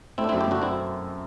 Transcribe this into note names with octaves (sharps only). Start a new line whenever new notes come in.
A3 C4 E4
D4
F#2 C4 E4
E4 G4
F#3 D4 F#4
C4 E4